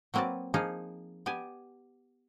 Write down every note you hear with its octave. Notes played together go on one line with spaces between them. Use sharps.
F#3 A#3 C4 F#4 B4 D5
F3 A#3 D#4 G#4 F5
B3 G4 D5 G#5